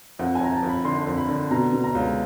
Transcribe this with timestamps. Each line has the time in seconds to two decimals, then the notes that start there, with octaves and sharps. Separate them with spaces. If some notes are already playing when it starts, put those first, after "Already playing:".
0.19 F2 F#5
0.35 G#5
0.41 F2 A#5
0.52 A5
0.63 F2
0.69 B5
0.85 D3 C6
1.07 F2
1.17 B5
1.28 D3
1.51 B2 A#5
1.73 B2
1.84 A#5
1.95 C#2